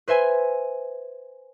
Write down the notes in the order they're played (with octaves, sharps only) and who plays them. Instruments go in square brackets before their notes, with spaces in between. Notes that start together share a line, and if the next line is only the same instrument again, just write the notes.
[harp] B4 C5 E5 G#5